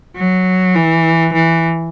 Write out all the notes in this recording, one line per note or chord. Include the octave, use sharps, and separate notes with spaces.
F#3
E3
E3